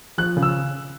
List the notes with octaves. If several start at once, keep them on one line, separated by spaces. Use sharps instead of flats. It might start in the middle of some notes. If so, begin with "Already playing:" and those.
F3 F#6
C#3
E6